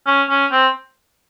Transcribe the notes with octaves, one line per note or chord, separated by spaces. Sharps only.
C#4
C#4
C4